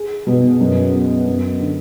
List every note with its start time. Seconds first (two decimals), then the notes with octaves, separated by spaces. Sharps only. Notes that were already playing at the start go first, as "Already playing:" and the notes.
Already playing: G#4
0.27 B2
0.60 F#2
0.94 B3
1.26 F#2
1.60 D3